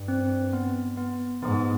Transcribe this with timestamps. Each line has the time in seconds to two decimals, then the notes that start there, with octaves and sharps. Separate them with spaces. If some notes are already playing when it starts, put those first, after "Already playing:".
Already playing: G2
0.08 C4
0.53 B3
0.97 B3
1.42 G#2 B3